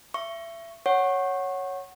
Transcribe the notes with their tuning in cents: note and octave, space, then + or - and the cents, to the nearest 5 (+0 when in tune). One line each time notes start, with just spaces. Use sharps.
E5 +30 C#6 +0
C#5 +0 F#5 +0 C#6 -25